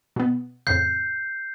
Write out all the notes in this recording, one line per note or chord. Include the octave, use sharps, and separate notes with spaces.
B2 B3
F2 A2 C#3 G6 C7